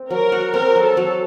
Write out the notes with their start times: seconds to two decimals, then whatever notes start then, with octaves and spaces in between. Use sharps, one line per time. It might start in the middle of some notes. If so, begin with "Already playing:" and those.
Already playing: C4
0.11 F#3 A#4
0.32 F#4
0.54 C4 A#4
0.76 F#3
0.82 A4
0.97 F#3